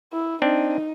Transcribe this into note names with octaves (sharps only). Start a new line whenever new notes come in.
E4
C4 D4 D#4